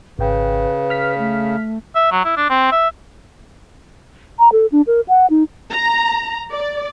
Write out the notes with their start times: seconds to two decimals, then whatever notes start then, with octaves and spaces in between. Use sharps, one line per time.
0.19 G#1 C#3 B4 G5
0.90 F6 B6
1.18 A3
1.95 E5
2.11 F#3
2.25 E4
2.37 D4
2.50 C4
2.72 E5
4.39 A#5
4.52 A4
4.72 D4
4.87 A#4
5.08 F#5
5.30 D#4
5.72 A#5
6.51 D5